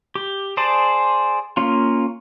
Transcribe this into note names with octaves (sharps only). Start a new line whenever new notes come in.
G4
G#4 C5 D5 A5
A#3 C#4 F4